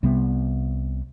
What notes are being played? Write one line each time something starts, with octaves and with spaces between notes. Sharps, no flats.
C2 C3 G3 B3